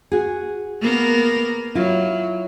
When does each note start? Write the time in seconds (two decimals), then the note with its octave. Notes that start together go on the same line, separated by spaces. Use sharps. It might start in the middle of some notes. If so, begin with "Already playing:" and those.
0.12 F#4 G#4
0.81 A#3 B3 A#4
1.75 F#3 E4 F4